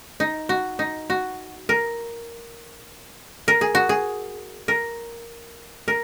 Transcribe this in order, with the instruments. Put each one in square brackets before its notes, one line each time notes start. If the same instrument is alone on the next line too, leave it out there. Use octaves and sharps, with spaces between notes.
[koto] D#4
F#4
D#4
F#4
A#4
A#4
G#4
F#4
G#4
A#4
A#4